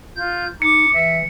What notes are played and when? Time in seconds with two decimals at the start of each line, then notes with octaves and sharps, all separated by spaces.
0.16 F4 G6
0.62 D#4 D6 C#7
0.94 E3 E5